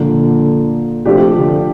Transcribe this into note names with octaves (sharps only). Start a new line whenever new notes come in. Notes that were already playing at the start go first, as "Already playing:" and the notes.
Already playing: A#2 D3 F3 A#3 D4
C3 F3 A3 D4 G4
D3